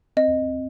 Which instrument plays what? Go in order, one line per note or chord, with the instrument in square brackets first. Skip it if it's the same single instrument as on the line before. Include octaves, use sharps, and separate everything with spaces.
[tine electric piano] C4 [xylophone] D#5